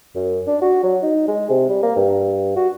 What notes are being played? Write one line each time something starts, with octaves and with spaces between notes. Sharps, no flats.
F#2
D4
F#4
F#3
D#4
G#3
C3
G3
A#3
G2
F#4